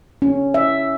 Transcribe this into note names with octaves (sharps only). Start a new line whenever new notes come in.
C#4
E5